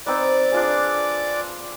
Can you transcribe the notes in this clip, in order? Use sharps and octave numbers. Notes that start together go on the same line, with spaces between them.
C4 D#4 B4 D5 D6
D4 F4 G#4